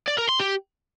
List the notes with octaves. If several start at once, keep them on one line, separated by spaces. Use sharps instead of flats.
D5
A#4
C6
G4